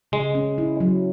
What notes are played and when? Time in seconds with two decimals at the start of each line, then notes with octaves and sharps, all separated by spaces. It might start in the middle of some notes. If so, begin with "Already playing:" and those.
0.12 C#3 G#3
0.35 C#4
0.58 E4
0.80 F#3